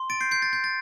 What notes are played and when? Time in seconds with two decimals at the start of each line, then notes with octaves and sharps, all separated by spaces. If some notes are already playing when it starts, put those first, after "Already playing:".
Already playing: C6
0.10 A6 D7
0.20 G6 C7
0.31 G6 C7
0.42 A6
0.53 G6 C7
0.64 A6